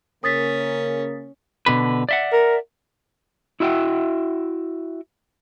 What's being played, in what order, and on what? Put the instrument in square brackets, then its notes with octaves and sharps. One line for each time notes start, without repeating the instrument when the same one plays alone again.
[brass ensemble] C#3 A#3 [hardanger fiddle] C#4 [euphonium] A#4 [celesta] D#6 A6 B6
[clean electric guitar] B2 D3 B4
D5 E5 F#5
[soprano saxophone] A#4
[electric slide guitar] E4 F#4 E5 G5